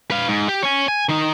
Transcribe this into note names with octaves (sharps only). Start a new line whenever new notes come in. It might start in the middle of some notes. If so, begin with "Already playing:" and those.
B4 F5
G#2
G4
C#5 G#5
G#5
D#3 D#4